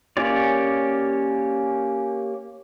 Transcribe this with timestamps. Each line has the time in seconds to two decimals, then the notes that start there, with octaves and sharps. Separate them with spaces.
0.17 A#3 C#4 G4 C#5 D5